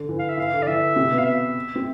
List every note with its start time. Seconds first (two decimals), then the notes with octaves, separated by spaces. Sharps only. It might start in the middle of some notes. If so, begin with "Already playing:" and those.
Already playing: D3
0.09 E3
0.19 F5
0.29 E5
0.37 E3 F5
0.53 D3
0.62 D5
0.67 E3 E5
0.96 C3 C4
1.11 B2 B3
1.19 F5
1.26 E5
1.76 C4